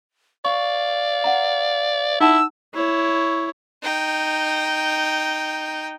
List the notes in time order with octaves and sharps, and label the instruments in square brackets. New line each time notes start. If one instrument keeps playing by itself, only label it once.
[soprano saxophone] D5 [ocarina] F5 [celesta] C#6
[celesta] F#5 A#5
[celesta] D#4 F#5 A5 [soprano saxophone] E4 [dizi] E6
[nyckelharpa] E4 C#5
[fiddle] D#4 G5